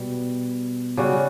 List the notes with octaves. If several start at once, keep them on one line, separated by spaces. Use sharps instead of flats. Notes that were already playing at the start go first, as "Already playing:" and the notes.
Already playing: B2 G3
C#3 G3 C#4 F#4